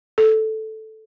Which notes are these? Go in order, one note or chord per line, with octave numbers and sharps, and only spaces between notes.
A4